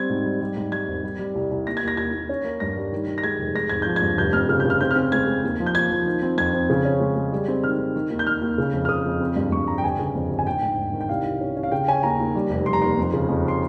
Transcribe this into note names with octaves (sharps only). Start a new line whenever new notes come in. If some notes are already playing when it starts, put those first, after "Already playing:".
Already playing: G3 C4 G#6
G#2
G3
G3
G#2
G3 G#6
G#1
G3
G3
C2
C2
D#2 A#6
G#6
D#2
A#6
D#2 G#6
D#2
C#4
A#3
G2 A#6
G3
D#3
D#3
A#6
G#3 G#6
F1
G#3 A#6
G#1 G#6
F3 G6
G#6
G2
F1 G6
F2 F6
C#3 F6
G6
C#3 F6
C4 G6
F6
C4
G#3 G#6
G#3
D#2
F3
G6
D#2 G#6
F3
D#3
C4
F2 G#6
C4
C#3
C#4
G#3
G#3
G3
C4
D#3 F6
D#3
D#3
D#2
G6
D#2 F6
D#2
C#3
F2
F6
C#3 D#6
F2
C4
G2
G2 C#6
G3 A#5
G5
G1 G#5
C#3
F2
G1
G#5
G#1 G5
G#2
G#1
D#3
G5
C2 F5
C2
C#4
C#4
F5
C#3 G5
C#4 G#5
D#2 A#5
D#2
G3
F1
G3 C6
A#5
D#2 C6
F2
C#3
F2
C6